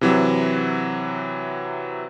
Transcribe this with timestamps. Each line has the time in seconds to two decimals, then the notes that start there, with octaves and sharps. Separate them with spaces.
0.01 C3 E3 F#3